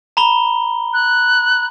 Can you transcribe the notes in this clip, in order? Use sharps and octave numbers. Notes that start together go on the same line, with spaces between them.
A#5 B5 G7
F#6